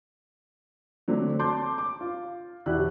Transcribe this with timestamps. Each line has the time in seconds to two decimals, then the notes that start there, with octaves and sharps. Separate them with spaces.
1.08 D3 F#3 A3 C4 D4
1.39 A5 C6 D6 G6
1.78 D6
2.01 F4
2.66 E1 E4 F#4 G4 D5 F#6